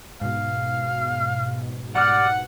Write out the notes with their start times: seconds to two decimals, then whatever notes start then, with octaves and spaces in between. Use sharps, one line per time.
0.21 G#2 B2 F5
1.96 G3 D5 F#5 F6